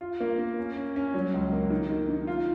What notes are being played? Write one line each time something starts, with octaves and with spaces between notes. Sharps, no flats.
F4
A#3
A#3
C#4
C#4
C#4
F#3
C#2
A#3
D#3
D#3
D#3
F4